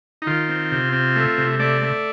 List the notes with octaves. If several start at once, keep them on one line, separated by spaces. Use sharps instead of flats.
D#4
D#3 F4
C4
C3
C4
A3
C3
A3 D5
A3